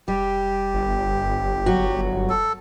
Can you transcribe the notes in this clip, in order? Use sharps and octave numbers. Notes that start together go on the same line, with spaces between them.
F1 G3 G4
G1
F#3 F#4
A4